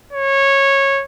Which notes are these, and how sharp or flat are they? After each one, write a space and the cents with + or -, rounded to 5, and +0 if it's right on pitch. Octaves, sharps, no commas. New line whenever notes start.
C#5 -15